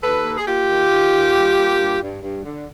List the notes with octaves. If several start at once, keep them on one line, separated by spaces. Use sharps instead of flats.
D#2 A4 B4
A#3
G#4
A#3 F4 G4
D#3
D#3
D#2
G3
A#3
G2
G2
G2
D3